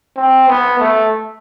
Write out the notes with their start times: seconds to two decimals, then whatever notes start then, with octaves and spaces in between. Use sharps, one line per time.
0.16 C4
0.47 B3
0.79 A3